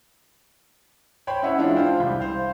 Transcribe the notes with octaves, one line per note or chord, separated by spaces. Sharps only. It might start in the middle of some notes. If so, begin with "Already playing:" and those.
C5 C#5 G5 B5
C#4 E4 D#5 E5 F#5
E3 G#3 D4 E4 F4
F4 C5 G5
C2 G3 B5 G6
C5 F5